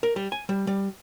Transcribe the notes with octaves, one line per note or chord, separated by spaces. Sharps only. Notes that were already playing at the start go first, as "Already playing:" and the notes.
A#4
G3
G#5
G3
G3